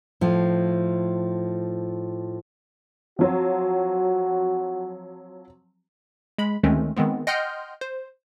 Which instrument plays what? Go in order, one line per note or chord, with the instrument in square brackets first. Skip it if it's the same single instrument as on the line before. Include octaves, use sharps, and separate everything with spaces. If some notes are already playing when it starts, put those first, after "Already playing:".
[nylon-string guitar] A2 F3
[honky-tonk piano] F3 F#3 C4 [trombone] F#4
[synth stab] G#3 B5
D2 D#3 G#3 A3 C4 C#4
D#3 G#3 B3 C4
D#5 F#5 G5 C6 F6 G6
C5